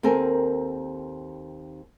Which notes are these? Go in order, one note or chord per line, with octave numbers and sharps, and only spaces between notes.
D#2 C4 A4 A#4 G#5